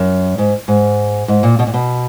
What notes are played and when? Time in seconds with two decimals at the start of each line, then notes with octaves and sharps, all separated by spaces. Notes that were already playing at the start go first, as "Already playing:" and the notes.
Already playing: F#2
0.38 G#2
0.68 G#2
1.28 G#2
1.43 A#2
1.59 B2
1.67 A#2
1.74 B2